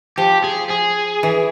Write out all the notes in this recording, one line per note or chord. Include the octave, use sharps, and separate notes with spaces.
F3 G4
G#4
G#4
E3